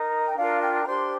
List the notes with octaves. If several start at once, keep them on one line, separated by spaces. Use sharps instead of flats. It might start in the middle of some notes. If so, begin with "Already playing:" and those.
Already playing: D#4 A#4
G5
D4 F4 A#4 F5
G5
A#5
D4 G4 C5 C6